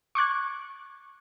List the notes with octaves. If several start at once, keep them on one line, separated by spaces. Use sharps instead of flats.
C#6 D6 F#6 G#6